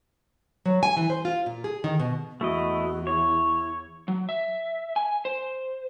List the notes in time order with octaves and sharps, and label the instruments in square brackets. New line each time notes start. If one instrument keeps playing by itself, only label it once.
[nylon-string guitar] F#3
G#5
E3
C5
F4
A#2
G#4
D#3
B2
[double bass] E2 [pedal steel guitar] A3 E4 D#5 [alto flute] F#4
[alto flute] E4 [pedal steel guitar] C#5
[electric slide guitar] F#3
E5
G#5
C5